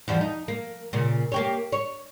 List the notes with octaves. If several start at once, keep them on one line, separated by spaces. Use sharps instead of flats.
E2 F3 G3
D#4
A#3
A#2 C#3
A#3 G4 C#5
C#5